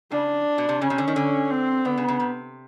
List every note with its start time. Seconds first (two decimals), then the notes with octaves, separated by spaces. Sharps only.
0.11 C#3 D4
0.58 B2
0.69 C3
0.82 C#3 C#4
0.90 C3
0.98 D3
1.08 D#3
1.16 D3
1.51 C4
1.85 D3 B3
1.98 C#3
2.08 C#3
2.20 C3